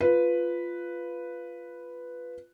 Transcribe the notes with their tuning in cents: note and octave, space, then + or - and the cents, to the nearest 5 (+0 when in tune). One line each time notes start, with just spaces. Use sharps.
F4 -5 B4 +0